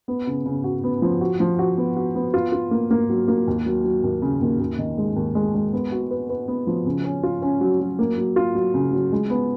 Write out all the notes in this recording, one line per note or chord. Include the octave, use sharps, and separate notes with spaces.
B3
C#3
C#3
F#4
B3
F3
F#4
F3
F#4
B3
F#4
B3
F4
F4
A#3
A#3
F#3
A#3
D#2
F#3
F#3
D#2
C#3
D#2
D#2
D#3
G#3
D#2
G#3
G#3
B3
F#4
B4
B4
B3
F3
C#3
C#4
F4
C#4
F#3
F#3
A#3
F#3
F4
F#3
C#3
F#3
G#3
B3